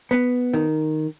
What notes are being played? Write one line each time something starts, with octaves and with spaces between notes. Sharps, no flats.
B3
D#3